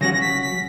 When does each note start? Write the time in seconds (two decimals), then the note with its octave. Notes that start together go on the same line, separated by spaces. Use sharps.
0.01 C#3 F#3 C#4 F#4 A#6
0.14 A#6
0.21 B6
0.42 B6